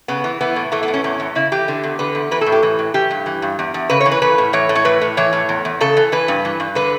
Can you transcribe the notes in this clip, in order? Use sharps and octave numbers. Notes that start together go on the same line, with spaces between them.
C#3 B3
E3
E3 B3
A2
E3 A3
B3
A2
C#4
E2 C#4
E2
C#3 E4
E3 G4
D3
E2
D3 B4
E2
E3 B4
A4
A2
G4
E3
A2
E3 G4
G2
E3
G2
E2
E2
C#3 B4
C#5
E3
B4
E3 B4
A2
E3 C#5
A2
C#5
E3 B4
A2
E3 C#5
A2
E2
E2
C#3 A4
E3
E3 B4
G2
E3
G2
D3 B4